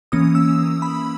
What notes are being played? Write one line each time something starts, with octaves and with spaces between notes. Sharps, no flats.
E3 A#3 C#4 D#6
E6
B5